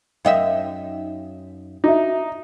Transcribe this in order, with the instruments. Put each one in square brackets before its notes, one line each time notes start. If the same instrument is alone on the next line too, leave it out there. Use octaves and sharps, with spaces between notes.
[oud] F#2 D#4 E5 [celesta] F5 G5
[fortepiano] D#4 [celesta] F#4 E5